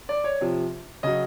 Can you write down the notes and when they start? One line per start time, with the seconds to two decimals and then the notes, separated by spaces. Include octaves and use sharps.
0.09 D5
0.24 C#5
0.41 C3 F3
1.03 C#3 F#3 D#5